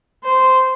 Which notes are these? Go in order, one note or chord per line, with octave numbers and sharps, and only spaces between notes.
C5